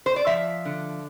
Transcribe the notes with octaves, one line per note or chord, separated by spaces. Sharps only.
C5
D5
F3 E5
D3